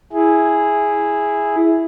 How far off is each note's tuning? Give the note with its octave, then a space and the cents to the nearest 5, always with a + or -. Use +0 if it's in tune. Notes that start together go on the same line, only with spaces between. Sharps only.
E4 +0 G#4 +0